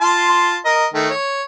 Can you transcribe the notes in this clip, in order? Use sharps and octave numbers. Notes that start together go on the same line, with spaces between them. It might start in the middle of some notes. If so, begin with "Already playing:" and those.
F4 A5 C6
A#4 D#5
D#3 A3
C#5